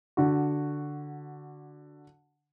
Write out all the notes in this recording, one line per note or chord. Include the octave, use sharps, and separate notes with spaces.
D3 F#4